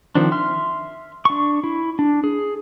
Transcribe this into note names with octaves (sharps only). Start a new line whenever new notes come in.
D#3 F3 C4 D4
E5 C6 F6
D4 C#6
E4
D4
G#4